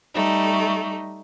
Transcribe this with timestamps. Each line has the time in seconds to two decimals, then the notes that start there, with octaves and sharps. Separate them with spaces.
0.15 G3 A3 D#4